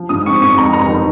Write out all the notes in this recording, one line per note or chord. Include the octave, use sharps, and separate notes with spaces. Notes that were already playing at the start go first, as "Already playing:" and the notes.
Already playing: F3
G#2 D#6
C4 C#6
G#2 C#6
F2 A#5
F1 A#5
D#3